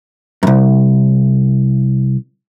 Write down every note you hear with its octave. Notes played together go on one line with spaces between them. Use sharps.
C2 F#2